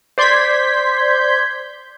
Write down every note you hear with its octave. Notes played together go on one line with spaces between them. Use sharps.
C5 D5 C6 G6 G#6 B6